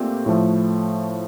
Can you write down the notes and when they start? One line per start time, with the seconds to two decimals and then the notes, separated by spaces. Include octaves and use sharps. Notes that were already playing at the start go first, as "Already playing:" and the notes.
Already playing: A#2 A3 C4 G4
0.26 A2 F3 A3